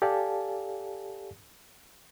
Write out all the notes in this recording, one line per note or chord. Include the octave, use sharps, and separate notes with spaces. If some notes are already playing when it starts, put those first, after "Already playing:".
G4 A4 D5 F5 G#5 A5